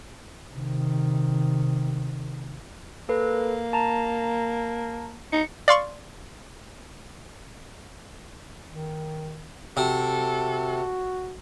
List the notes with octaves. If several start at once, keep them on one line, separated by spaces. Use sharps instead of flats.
C3 D#3
A#3 A4 B4
A5 A#5
D#4 C#7
D5 F5 C6 C#6
D#3
C3 F#4 A4